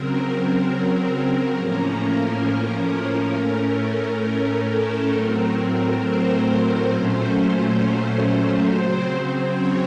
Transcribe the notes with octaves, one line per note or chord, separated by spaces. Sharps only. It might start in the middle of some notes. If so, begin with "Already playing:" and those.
Already playing: C#3 F#3 C4 A#4
A2 F3 A#3 C#4 A#4
A2 A3 C#4
A#4
A4
A2 F#3 A3 C4 A#4
C5
A#2 F#3 A3 C#4
C#3 F#3 C4
C#5